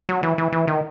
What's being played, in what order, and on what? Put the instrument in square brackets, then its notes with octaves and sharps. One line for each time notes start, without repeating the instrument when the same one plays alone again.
[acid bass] F#3
E3
E3
E3
D#3